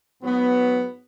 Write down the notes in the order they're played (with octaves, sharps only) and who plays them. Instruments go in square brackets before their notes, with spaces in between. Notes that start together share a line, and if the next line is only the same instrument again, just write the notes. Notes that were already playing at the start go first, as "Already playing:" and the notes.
[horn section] G#2 F#3 B3